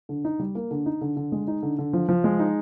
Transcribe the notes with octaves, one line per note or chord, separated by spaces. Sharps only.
D3
D#4
G3
A#3
D3
D#4
D3
D3
G#3
D#4
D3
D3
F3
F3
G#3
D#4